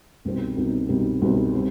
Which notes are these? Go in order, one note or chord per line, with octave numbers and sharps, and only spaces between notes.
C2 B2 G3 C4 D#4
C2 B2 G3 C4 D#4
C2 B2 G3 C4 D#4
C2 B2 G3 C4 D#4
G3 C4